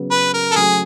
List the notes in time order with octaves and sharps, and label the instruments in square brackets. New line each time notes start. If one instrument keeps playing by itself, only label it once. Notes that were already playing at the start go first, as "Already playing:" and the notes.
Already playing: [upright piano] C#3 F#3 B3
[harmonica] B4
A#4
A4
[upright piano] C#3 F#3 A3 [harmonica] G#4